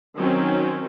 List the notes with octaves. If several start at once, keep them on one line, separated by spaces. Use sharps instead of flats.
D#3 F#3 C4 C#4